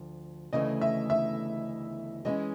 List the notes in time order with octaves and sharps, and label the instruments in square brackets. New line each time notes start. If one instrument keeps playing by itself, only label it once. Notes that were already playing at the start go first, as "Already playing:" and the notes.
Already playing: [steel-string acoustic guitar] D2 F3
[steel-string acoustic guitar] D2 C#3 E3 A3 [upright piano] D#5
[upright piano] E5
E5
[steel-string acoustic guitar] E3 G#3 C#4 [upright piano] D#5